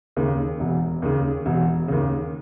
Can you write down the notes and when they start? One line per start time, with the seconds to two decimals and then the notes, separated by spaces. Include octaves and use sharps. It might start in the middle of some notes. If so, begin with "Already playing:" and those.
0.16 D#2 C#3
0.60 E1
1.02 D#2 C#3
1.46 E1
1.88 D#2 C#3